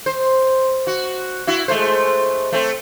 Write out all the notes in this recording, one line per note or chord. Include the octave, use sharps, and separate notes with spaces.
C5
F#4
E4 F#4
G#3 A3 C5
A3 C4